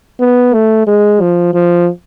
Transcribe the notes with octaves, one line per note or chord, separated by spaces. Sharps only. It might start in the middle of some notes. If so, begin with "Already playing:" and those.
B3
A3
G#3
F3
F3